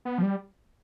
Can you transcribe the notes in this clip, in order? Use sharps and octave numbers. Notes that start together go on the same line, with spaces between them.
B3
F3
G3